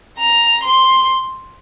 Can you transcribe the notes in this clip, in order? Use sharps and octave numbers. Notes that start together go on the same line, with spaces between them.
A#5
C6